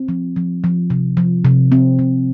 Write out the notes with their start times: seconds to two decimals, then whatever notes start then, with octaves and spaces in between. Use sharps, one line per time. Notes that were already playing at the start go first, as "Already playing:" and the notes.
Already playing: C4
0.09 F3
0.36 F3
0.64 F3
0.90 C3
1.17 F3
1.45 C3
1.72 C4
1.99 C3